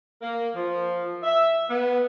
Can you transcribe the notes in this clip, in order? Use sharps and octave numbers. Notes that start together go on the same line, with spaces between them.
A#3
F3
E5
B3